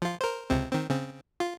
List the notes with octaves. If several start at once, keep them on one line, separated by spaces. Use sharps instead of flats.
F3 F4
A#4 C5
C#2 C3 C4
D#3 C4
C#3 C4
F4